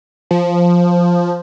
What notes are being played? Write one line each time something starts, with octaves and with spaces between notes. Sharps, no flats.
F3